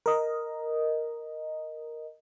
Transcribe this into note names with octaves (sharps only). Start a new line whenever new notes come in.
A#4 D#5